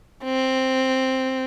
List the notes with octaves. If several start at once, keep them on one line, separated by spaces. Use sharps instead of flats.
C4